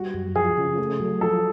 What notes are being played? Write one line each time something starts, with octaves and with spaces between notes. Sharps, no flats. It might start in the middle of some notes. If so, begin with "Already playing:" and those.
Already playing: G3 F#4
F#2
F3 G#4
C#3
A3
F#3
F3 A4